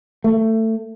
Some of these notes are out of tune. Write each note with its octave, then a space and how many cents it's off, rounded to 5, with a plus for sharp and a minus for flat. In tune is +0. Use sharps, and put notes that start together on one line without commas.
A3 +20